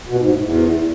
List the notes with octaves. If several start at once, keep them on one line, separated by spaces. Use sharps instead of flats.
B2
G#2
A2
E2